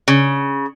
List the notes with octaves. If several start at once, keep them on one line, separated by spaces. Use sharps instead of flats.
C#3